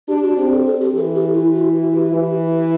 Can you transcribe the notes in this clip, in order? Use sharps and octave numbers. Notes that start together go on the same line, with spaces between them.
D4 G4
F#4
C4 G4
A4
A4
G4
E3 A4
G4
E4
F#4
F#4
G4
E3